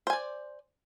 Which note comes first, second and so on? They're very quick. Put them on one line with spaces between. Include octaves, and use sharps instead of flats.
C5 G#5 D5